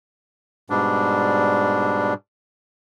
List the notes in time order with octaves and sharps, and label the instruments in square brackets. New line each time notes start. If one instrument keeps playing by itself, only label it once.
[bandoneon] G#2 B2 G3 D4